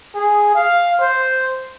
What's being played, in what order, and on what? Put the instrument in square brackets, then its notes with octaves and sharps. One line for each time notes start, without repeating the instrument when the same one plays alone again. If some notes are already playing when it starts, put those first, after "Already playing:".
[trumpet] G#4
F5
C5